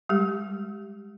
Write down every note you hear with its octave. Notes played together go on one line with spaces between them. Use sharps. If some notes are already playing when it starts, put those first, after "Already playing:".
G3 G#3 G4